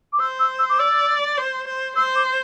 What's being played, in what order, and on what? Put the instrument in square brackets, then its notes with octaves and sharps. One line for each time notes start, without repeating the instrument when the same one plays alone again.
[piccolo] D6
[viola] C5 [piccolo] E6
[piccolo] E6
E6
D6
[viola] D5 [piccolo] E6
[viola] C5
C5
[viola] C5 [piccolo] E6
[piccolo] D6